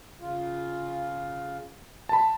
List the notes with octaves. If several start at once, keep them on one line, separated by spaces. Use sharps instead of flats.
C#3 F4
A5 B5